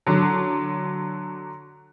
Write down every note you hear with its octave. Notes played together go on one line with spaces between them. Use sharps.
D3 F#3